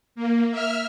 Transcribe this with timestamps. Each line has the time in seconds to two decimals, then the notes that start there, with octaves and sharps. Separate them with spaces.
0.15 A#3
0.51 E5 F6